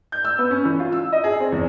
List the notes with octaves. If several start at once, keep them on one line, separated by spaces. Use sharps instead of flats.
G6
E6
B3
C#4
E3
F4
E6
D#5
G#4
C4
E2